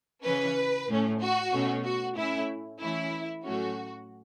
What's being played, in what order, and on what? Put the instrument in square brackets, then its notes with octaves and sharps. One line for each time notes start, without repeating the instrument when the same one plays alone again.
[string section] C#3 E3 C#4 B4
A2 A3 C#4
F#4
B2 A3 C#4
F#4
A2 A3 C#4 E4
E3 A3 C#4 E4
A2 F#3 A3 C#4 F#4